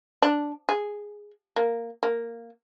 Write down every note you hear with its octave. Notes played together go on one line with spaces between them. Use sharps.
D4
G#4
A#3
A#3